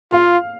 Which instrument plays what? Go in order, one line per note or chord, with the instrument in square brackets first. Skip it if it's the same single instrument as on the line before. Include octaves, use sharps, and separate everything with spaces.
[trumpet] F4 [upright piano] F5